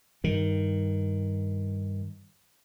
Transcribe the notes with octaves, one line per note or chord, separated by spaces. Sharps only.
G2 D#3